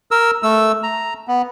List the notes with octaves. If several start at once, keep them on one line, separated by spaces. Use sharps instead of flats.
A#4 E6
A3 E6
A#5
B3